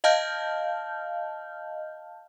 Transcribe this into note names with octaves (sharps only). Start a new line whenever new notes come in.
D#5 F5 A5 F6 G6